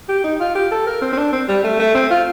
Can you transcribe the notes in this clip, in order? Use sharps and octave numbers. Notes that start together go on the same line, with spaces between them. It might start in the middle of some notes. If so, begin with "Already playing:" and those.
G4
D#4
F4
G4
A4
A#4
C4
C4
D4
C4
G3
A3
A3
C4
F4